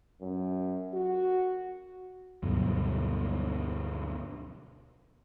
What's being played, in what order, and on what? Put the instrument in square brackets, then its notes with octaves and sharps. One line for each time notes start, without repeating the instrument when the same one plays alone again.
[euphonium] F#2
F#4
[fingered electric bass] D2 G2 B2 F#3